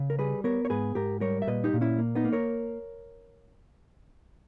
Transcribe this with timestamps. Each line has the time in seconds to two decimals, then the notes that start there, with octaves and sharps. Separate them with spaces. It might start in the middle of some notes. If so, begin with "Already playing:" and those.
Already playing: C#3
0.10 A#4
0.19 G3 G#4 B4
0.44 B3 A#4 C#5
0.65 C#5
0.70 G#2 G#4 B4
0.95 G#2 G4 A#4
1.21 G3 A#4 C#5
1.42 E5
1.47 A#2 B4 D#5
1.64 D#4 G4
1.73 A#2
1.81 C#4 E4
1.98 A#3
2.15 B3 D#4
2.24 A#3
2.33 A#4 C#5